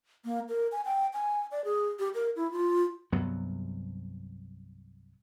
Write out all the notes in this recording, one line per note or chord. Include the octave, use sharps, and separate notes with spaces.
A#3
A#4
G#5
G5
G#5
D5
G#4
G4
A#4
E4
F4
C2 G2 F#3 B3